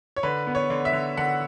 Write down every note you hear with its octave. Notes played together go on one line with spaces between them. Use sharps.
C#5
D3 B4
B3
C#5
D3
E5
D3
D3 F#5